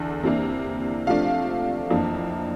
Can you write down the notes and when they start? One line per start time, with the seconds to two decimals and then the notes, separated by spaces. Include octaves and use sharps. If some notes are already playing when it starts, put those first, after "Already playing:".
Already playing: E2 D3 D4
0.23 C3 E3 A#3 D4
1.07 C3 F3 A3 D4 F5
1.90 F2 E3 A#3 D4